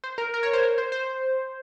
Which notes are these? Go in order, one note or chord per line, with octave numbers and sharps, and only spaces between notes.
C5
A#4
A#4
C#5
C5
A#4
C5
C5